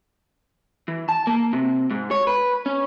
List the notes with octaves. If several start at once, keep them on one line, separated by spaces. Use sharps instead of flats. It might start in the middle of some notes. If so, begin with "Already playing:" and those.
E3
A5
A#3
C3
G#2
C#5
B4
C#4